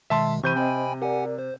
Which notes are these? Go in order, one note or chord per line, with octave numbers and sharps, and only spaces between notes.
B2 D#3 G#3 E5 A5 C6
C3 E3 C5 B5 C#6 G6 D#7
C4 C5 D#5 G5 G#5 B5
G4 A#4 D5 F#5 G#5
C5